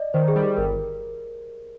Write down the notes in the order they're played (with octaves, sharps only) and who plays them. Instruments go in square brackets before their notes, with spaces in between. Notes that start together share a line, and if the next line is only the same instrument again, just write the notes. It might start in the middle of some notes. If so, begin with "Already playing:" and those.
Already playing: [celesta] D5 D#5
[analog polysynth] D#3 [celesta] C5
[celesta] G#4
[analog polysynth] G3
[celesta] G4
[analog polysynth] G1 [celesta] A#4